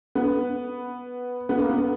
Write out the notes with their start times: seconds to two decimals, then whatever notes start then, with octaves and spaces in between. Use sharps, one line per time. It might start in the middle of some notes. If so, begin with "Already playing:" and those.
0.15 B3
1.49 B3
1.59 A#3
1.70 B3